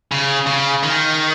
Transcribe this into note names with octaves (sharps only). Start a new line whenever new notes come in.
C#3
C#3
D#3